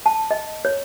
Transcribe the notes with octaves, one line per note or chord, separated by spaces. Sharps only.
A5
D#5
C#5